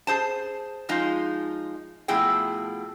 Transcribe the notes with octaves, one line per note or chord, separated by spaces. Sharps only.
G#4 C5 A5
F3 G#3 D#4 F4
B2 F3 A3 E4 G#4 G5